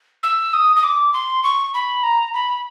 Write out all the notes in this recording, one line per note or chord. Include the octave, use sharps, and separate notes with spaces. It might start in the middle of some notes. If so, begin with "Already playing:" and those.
E6
D#6
D#6
D6
C6
C#6
B5
A#5
B5